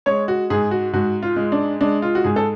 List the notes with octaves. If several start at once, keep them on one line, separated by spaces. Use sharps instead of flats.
G#3 C#5
F#4
G#2 G#4
F#4
G#2 F#4
F4
G#3
D4
G#3 D4
F4
F#4
G#2 G#4
A4